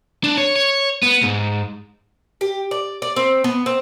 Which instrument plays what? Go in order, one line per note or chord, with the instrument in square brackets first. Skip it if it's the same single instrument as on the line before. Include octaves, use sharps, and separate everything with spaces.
[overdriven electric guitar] D4
C#5
C#5
B3
G#2
[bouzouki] G4
D5
D5
C4
B3
C4